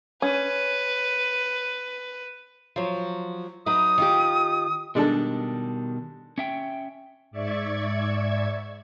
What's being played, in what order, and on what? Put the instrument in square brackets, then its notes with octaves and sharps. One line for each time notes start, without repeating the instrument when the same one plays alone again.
[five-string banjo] C#4 [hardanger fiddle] B4
[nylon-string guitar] F3 F#3
[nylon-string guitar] F#3 D#4 B4 [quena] D#6
[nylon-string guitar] D#3 F4 G4
[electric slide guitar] B2 D#3 G3 [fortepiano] G#3 D4 A4
[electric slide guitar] C#4 E5 G5
[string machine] G#2 D5 E5 C#6 G#6